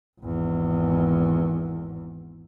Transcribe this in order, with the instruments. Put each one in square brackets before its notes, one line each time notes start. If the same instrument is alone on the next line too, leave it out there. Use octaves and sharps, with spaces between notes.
[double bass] G#1 E2